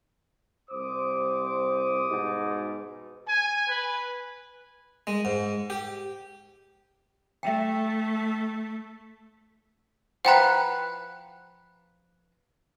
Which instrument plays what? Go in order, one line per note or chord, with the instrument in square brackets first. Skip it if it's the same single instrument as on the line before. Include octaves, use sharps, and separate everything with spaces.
[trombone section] C2 C5 [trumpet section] D6 D#6
[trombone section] G#2 B2
[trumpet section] G#5
B4
[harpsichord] G#3
G#2
G4
[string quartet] A3 [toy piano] E5 G5
[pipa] F3 B4 [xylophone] F#5 G5 A#5